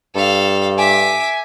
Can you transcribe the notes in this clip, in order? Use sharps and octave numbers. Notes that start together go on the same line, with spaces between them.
G2 A4 F5
E5 G#5 D6